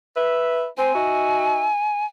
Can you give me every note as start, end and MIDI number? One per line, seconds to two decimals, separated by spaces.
0.15 0.66 71
0.15 0.66 76
0.78 0.91 60
0.78 2.06 80
0.94 1.67 63
0.94 1.67 66
0.94 1.67 76